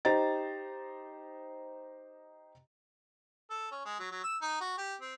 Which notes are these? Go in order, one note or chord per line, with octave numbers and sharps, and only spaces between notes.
D#4 G4 C5 D#5 A#5 A6
A4
C#4
G#3
F#3
F#3
E6
D#4
F#4
G4
C4